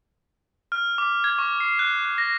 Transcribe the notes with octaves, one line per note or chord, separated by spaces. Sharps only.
F6
D6
G#6
C#6
C7
F#6
F#6
A#6